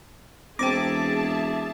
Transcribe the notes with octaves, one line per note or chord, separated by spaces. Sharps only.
E1 C4 G#4 C5 E5 G5 A5 D6